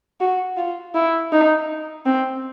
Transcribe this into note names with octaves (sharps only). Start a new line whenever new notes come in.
F#4
F4
E4
D#4
C4